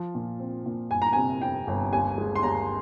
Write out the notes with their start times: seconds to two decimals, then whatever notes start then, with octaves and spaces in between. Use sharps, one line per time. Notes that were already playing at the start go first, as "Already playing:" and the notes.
Already playing: F3
0.15 A#2
0.39 C4
0.66 A#2
0.91 G1 G#5
1.02 A#5
1.13 C3 G#5
1.42 F2 G5
1.67 G1
1.93 D#2 G#5
2.18 G#3
2.36 C6
2.43 D#2 A#5